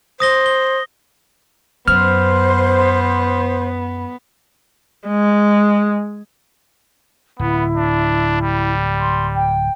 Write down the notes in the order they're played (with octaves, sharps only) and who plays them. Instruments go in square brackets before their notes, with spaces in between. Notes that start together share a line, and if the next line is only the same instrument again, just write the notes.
[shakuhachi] C5 [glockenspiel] D#6 A#6 G7
[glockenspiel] G7
[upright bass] F#2 [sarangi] B3 [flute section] C5 [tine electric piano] F6
[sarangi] G#3
[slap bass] D1 [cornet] B3 [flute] E4
[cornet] D4
G3
[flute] C6
G5